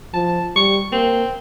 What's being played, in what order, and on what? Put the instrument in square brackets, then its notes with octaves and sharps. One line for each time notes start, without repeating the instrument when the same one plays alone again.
[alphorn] F3 [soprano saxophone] A5
[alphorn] G3 [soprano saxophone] C#6
[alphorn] A#3 [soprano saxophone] C4